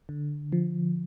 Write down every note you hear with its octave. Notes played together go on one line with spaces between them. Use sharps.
D3
F3